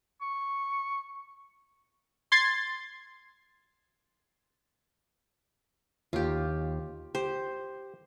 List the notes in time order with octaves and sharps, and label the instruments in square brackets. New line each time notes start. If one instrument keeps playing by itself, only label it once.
[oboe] C#6
[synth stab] C6 G#6 A6 C7
[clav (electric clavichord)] D#2 [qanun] F4 G4
[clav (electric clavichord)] G4 [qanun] C5